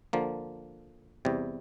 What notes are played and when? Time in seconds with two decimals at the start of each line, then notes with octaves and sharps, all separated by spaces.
0.13 D3 F3 A#3
1.25 E2 C3 G3